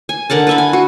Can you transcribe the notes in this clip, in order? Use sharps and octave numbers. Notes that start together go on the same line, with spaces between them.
G#5
D3 A#4 F#5 A5
B4 E5 B5
G#5
F#4